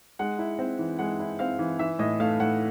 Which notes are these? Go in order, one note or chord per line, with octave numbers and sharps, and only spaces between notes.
G#3 F#5
E4
C4
E3
G#3 F#5
E4
C4 F5
E3
E3 E5
A2 D#5
A3 F5
A2 F#5